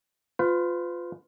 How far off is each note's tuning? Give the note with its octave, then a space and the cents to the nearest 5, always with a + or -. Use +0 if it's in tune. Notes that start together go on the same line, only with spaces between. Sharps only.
F4 +10 B4 +35